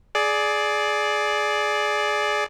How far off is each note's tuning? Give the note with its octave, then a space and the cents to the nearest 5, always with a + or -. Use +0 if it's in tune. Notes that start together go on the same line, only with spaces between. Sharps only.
G#4 +20 D5 +0